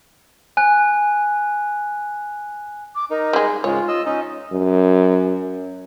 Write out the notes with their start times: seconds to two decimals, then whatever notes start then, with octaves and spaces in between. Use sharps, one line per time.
0.57 G#5 F#6
2.95 D6
3.10 D#4 A#4
3.33 G3 G#3
3.64 G#2 C#3 G#3 F4 C#5
3.88 D#5 E6
4.06 C#4 D#4 D#5
4.52 F#2